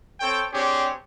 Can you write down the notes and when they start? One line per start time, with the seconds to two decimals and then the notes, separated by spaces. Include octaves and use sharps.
0.20 C4 A4 C#5 G5
0.52 C4 D4 G4 G#4 C#5